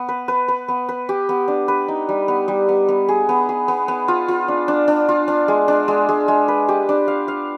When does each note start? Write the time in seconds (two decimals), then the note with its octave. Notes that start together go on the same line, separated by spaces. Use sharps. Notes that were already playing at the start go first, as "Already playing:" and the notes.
Already playing: B3
0.09 B4
0.28 B4
0.48 B4
0.68 B3
0.89 B4
1.09 G4
1.29 B3
1.48 D4
1.68 B4
1.88 D#4
2.09 G3
2.28 B3
2.48 G3
2.69 B3
2.89 B3
3.08 G#4
3.29 B3
3.49 G#4
3.68 B3
3.88 B3
4.08 F4
4.28 F4
4.48 D4
4.68 D4
4.88 D4
5.09 F4
5.28 D4
5.48 G#3
5.68 D4
5.88 G#3
6.09 G#3
6.28 G#3
6.48 B4
6.68 G4
6.89 D4
7.08 F5
7.28 F5